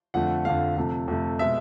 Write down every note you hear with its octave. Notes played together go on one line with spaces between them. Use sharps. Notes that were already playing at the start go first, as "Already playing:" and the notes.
F2 D3 F3 A3 F#5
F2 D3 F3 A3 F5
F2 C3 F3 A3
F2 C3 F3 A3
B2 G#3 E5